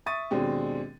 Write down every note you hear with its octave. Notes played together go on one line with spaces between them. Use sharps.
E5 C#6 D#6 A6 D#7
D#2 B2 G#3 C4 D4